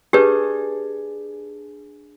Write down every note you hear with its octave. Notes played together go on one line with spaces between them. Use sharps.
D4 G4 G#4 B4 G6